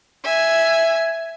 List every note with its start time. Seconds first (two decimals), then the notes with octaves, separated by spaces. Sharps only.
0.24 E5 G#5